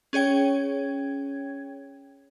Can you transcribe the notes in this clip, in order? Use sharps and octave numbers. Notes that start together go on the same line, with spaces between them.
C#4 G#4 C#5 G5 G#6